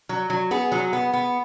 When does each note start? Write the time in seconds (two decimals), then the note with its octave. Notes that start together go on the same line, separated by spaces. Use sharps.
0.09 F#3
0.30 F#3
0.51 B3 G#4
0.72 F#3
0.93 B3
1.14 B3